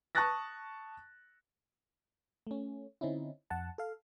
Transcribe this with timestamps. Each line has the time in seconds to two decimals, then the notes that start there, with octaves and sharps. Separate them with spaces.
0.15 A5 C#6 D#6 F#6 A6 A#6
2.47 A3 C#4
3.01 D3 C4 C#4 D#4 E4
3.50 F2 F#5 A5
3.78 A4 F5